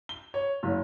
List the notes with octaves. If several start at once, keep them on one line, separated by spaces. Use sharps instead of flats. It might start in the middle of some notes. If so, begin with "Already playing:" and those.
G7
C#5
F#1